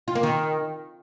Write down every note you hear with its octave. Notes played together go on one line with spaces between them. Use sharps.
F4
A#3
D#3